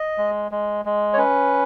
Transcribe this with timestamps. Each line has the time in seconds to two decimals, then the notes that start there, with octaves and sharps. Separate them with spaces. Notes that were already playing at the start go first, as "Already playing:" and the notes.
Already playing: D#5
0.18 G#3
0.51 G#3
0.85 G#3
1.13 C#5
1.17 C#4 B4